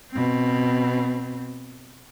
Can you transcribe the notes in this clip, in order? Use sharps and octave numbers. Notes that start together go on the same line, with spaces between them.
B2 C4